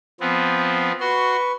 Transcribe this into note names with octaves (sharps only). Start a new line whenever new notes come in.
F3 B3 C4
F#4 B4 C6 C#6